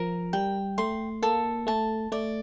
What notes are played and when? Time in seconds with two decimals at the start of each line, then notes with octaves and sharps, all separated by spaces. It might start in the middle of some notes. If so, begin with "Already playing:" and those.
Already playing: F3 A#4
0.33 G3 G5
0.78 A3 C6
1.22 A#3 A4
1.67 A3 A5
2.12 A3 D5